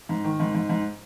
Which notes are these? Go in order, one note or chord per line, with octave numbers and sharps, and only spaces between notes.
G#2
D#3
G#2
G#2
G#2